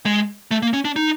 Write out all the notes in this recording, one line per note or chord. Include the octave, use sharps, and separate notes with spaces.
G#3
A3
A#3
C#4
D4
D#4